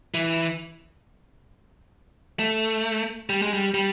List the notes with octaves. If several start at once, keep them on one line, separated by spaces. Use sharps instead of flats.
E3
A3
G3
G#3
G3
G3